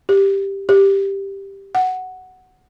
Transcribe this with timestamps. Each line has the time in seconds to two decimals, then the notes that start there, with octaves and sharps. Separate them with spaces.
0.09 G4
0.69 G4
1.75 F#5